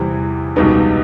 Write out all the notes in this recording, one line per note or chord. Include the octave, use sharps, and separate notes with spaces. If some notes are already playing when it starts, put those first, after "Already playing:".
Already playing: E2 C3 E3 G3
C#2 B2 G3 B3 D#4